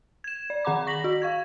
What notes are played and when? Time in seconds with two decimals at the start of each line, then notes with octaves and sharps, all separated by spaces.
0.24 G#6 E7
0.50 D5
0.65 D#3 G#4 F#5 A#5 B5 D6
0.87 C#6 A#6 B6 F#7
1.04 F#4
1.22 F5 C#6 G#6